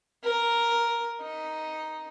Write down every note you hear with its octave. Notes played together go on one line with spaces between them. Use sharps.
A#4
D#4